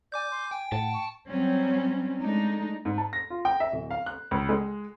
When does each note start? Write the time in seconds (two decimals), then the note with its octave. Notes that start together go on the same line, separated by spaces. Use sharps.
0.12 D5 G#5 D6 G6
0.31 C6
0.51 G5 G#5
0.72 A2 F#5 A5
0.93 C#6
1.28 F#3 G3 C4 C#4
2.22 G#3 A3 D4 D#4
2.85 G#2
2.98 A5
3.13 A#6
3.30 F4
3.45 G5
3.60 E5
3.72 D1
3.91 F5
4.06 F#6
4.31 C#2
4.49 G#3